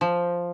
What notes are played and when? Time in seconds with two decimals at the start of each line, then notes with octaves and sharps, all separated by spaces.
0.01 F3